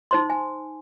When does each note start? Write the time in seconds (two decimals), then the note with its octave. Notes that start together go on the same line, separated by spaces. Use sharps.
0.11 D#4 C5 C6
0.30 G#5